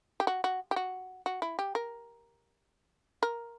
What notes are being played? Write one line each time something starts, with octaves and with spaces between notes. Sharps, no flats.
G4
F#4
F#4
G4
F#4
F#4
E4
G4
A#4
A#4